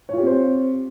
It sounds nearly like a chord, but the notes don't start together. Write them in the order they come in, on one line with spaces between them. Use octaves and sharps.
C#5 F4 G4 C4 C5